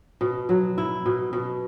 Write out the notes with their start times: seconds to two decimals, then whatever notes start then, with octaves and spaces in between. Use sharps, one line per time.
0.21 B2
0.49 F#3
0.78 E4
1.06 B2
1.33 B2